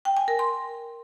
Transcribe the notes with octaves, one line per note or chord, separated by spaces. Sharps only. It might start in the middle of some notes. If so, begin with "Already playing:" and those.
G5
G#5
A#4
C6